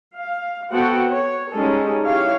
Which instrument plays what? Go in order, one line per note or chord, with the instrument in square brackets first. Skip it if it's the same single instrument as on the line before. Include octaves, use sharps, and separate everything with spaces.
[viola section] F5
B3 C4 F#4 A4 F#5 G5
C#5
G3 G#3 C#4 D#4 G#4 A4
E4 G4 C#5 F5